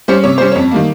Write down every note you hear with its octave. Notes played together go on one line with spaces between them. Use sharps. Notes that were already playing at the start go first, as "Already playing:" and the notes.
G3 C#4 C5
C3 C#5
G3 C#4 C5
F2 C#5
D#3 G3 A#3